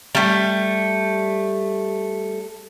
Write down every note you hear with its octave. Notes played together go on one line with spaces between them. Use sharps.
G3 A3